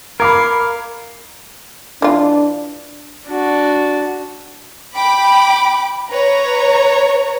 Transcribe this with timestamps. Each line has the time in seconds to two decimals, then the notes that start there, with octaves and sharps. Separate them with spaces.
0.20 A#4 F5 B5 D6 G#6
2.02 E3 D4 F4
3.27 D4 F#4
4.94 G5 B5 D6
6.11 B4 C#5 A#5